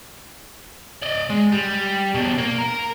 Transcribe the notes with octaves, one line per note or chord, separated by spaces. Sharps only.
D5 D#5
G#3
G3
B2 D4
A#3
A#4